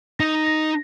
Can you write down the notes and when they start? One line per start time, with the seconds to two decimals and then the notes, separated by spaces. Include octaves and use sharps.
0.19 D#4 A#6
0.47 A#6